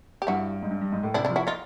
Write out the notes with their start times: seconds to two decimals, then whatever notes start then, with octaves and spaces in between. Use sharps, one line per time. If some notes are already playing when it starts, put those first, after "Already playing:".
0.22 G4
0.27 G2 E4 F#4
0.62 G#2
0.70 G2
0.81 G2
0.92 G#2
1.03 A2
1.14 C3 D4 E4
1.25 D4 E4
1.29 F3
1.36 E4 F#4
1.47 D#4 F4